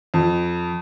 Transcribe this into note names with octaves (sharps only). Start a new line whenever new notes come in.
F2